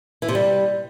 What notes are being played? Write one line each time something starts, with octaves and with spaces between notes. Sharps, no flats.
E3
C3
G3